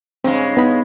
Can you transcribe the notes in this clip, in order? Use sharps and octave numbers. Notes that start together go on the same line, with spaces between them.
G2 C#3 G#3 C4
B3 D#4 B5